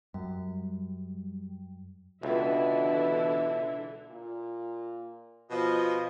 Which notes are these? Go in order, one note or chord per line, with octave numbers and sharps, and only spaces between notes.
F#2 G3
C#2 B2 D3 E3 E4 E5
A#2
B2 F3 F4 D#5